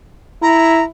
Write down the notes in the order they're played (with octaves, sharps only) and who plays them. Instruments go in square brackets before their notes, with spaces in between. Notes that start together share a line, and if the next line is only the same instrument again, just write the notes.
[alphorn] E4 [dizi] A#5